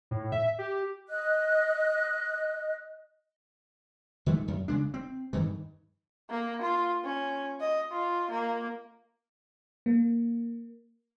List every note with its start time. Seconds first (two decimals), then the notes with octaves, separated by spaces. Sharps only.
0.11 A2
0.32 E5
0.59 G4
1.09 D#5 F#6
4.26 D#3 G#3 A3
4.48 F#2
4.68 C#3 G#3 D4
4.94 C4
5.33 G2 D#3 E3
6.30 A#3
6.62 F4
7.04 C#4
7.60 D#5
7.92 F4
8.31 A#3
9.86 A#3